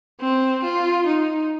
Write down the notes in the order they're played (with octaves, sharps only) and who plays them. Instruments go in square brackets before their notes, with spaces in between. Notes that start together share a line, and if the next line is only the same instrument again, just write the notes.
[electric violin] C4
F4
D#4